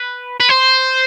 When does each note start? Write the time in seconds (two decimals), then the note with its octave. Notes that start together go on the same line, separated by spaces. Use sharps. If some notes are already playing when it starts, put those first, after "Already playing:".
Already playing: B4
0.40 B4
0.49 C5